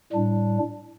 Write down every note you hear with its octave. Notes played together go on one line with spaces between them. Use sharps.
A2 G3 D4